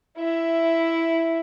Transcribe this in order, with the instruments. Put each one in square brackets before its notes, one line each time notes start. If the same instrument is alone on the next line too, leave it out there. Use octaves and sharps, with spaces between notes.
[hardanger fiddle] E4 E5